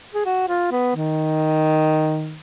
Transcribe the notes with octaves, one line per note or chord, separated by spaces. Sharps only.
G#4
F#4
F4
B3
D#3